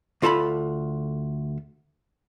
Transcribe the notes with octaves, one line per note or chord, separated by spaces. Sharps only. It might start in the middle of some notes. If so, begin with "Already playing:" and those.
D2 F4 A4 A#5 B5